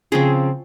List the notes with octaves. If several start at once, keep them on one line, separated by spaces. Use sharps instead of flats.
C#3 F3 C4 G#4